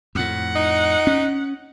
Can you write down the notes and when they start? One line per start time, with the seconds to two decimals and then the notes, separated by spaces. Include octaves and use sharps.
0.15 F2 A2 F#5
0.56 D#4
1.07 C#4